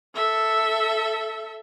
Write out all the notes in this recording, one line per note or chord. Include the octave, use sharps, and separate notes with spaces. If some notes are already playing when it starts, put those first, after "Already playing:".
A4 E5